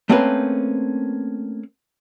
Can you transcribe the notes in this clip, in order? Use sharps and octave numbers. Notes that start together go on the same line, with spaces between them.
A3 A#3 C4 C#4 A#4 B4